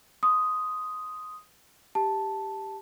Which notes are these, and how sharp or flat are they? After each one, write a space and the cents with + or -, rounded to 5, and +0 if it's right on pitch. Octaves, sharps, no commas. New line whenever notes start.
C6 +0 D#6 +5
G4 +0 A5 +0